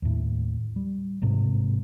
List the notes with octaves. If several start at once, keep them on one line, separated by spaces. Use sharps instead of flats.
D#2 A2
G3
A1 G#2 C3